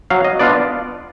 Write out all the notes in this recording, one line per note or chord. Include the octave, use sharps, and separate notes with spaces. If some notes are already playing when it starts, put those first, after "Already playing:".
F#3 F5
D#5
B3 D4 F4 D5